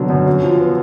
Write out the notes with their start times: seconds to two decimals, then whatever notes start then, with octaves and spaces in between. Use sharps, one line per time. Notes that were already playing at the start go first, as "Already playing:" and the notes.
Already playing: B2 D3 F#3 B3
0.10 F#2
0.27 F#4
0.43 F3
0.61 B3